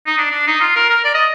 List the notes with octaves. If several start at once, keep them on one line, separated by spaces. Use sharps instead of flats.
D#4
D4
D4
D#4
F4
A#4
A#4
D5
D#5